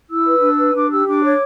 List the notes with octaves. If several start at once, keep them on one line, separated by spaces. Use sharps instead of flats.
E4 E6
B4
D4
B4
D4 D6
G4 E6
D4 D6
C#5